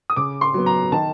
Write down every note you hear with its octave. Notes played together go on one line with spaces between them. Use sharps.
D#6
C#3 D6
C6
F#3 B3
A#5
D#3 A5